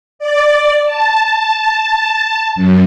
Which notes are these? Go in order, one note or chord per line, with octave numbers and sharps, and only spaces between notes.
D5
A5
F#2